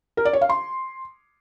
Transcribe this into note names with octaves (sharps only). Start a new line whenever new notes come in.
A#4
D5
C#5
F5
C6